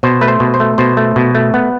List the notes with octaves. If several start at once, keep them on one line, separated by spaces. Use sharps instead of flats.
B2 C5
A3 B4
C5
B2
C5
A3
B2 C5
A3
B2
A3
B3